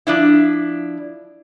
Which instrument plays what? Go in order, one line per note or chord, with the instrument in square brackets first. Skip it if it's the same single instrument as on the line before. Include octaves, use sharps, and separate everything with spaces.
[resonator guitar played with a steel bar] F3 D4 E4